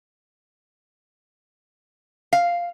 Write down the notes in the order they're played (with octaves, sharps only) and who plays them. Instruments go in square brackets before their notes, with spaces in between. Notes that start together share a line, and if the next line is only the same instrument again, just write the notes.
[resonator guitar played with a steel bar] F5